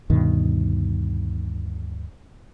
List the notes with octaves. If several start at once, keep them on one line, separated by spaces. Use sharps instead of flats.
D2 G2 B2 D#3